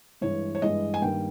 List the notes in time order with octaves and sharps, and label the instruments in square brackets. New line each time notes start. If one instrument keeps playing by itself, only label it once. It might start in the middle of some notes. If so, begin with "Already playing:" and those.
[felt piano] G2 E3 G#3 C#5
C#5
G2 E3 G#3 D#5
G#5
G2 D#3 G3 A#3 G5